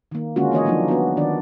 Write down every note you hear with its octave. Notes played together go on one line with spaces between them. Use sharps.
D#3 A#3
D3 G#3 A#3 C#4 F4 F#4
E3 A#3 C#5 D#5
F3 F#3 A#3 D4 D#4
B3 F#4
D#3 D4 D5